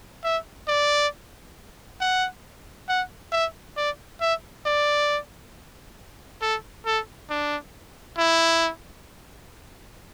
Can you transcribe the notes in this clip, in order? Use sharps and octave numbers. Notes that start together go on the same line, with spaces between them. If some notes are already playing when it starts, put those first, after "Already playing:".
E5
D5
F#5
F#5
E5
D5
E5
D5
A4
A4
D4
E4